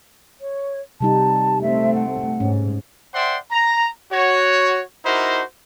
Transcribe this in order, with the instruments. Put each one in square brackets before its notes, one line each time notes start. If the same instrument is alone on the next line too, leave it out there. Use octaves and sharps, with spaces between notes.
[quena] C#5
[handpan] C3 G3 D#4 [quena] A5
[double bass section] A3 C4 [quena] E5
[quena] F#5
[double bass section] G#2 [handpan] C#4
[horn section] C5 D5 E5 F#5 G5 C6
A#5
F#4 C#5
D#4 E4 F#4 A#4 C5